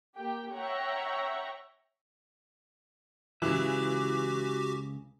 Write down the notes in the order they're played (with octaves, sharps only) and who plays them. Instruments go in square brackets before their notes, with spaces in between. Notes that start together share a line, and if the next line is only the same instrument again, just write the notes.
[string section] A#3 G4 G5
C#5 E5 F#5 G5 A#5 C#6
[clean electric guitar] C#2 C#3 E5 [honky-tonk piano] E3 [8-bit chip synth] F#4 G4 D6